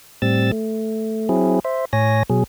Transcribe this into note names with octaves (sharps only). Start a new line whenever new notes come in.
A2 G3 C4 E6 A6
A3
F#3 C4 E4 G#4
C5 E5
A2 C#5 G#5 A#6
B2 F#3 G#4